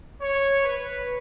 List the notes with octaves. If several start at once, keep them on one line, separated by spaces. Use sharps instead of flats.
C#5
B4